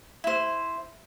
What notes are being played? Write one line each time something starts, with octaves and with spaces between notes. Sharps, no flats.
E4 C5